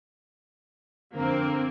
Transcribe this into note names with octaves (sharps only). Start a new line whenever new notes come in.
F2 D3 A#3 C4